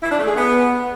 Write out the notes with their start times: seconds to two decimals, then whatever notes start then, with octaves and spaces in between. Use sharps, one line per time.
0.02 E4
0.10 D4
0.19 A3
0.27 G#4
0.35 B3